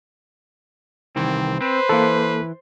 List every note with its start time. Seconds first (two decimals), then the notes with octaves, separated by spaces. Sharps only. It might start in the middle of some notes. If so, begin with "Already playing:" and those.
1.16 C2 D#3 E3 C4
1.61 C4 B4 C5
1.89 E3 A#3 A4